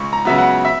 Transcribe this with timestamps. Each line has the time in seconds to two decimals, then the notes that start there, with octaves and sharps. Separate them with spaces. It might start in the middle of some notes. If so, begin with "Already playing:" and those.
Already playing: C#2 C#6
0.13 A#5
0.25 C#3 F#3 B3 E5
0.38 F#5
0.65 E5